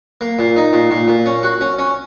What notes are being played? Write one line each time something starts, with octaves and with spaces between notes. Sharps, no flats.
A#3
A#2
D#4
A#2
A#2
A#2
C#4
F#4
C#4
C#4